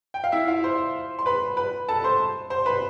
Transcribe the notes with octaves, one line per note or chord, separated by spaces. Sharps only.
G5
F5
E4 E5
F4 F5
C5 C6
C6
B4 B5
B4 B5
A4 A5
C5 C6
C5 C6
B4 B5